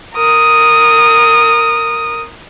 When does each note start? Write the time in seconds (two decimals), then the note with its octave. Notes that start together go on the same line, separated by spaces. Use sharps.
0.15 A#4 D#6